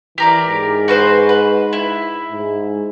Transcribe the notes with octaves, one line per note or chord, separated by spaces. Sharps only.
E3 G4 A#4 D5
G#2
F#4 B4 C5
B4
E4
G#2